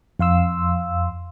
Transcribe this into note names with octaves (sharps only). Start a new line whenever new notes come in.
F2 F5 C6 E6